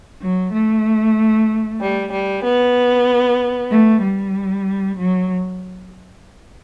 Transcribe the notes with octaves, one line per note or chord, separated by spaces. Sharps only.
F#3
A3
G3
G3
B3
A3
G3
F#3